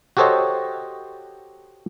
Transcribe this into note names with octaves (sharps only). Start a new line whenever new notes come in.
F#4 G4 A4 C5 C#5 D#5